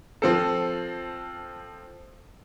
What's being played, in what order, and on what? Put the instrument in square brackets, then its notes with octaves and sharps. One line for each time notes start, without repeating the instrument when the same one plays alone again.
[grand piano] F3 C4 A4